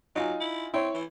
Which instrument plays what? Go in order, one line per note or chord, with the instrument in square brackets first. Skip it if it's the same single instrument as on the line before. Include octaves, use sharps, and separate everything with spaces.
[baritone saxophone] F#3 [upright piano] D#4 F4 G#5
[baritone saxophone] E4
[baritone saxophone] C4 [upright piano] E4 C#5
[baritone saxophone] E3